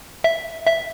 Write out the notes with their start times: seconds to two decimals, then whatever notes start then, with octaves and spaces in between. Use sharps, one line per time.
0.24 E5
0.67 E5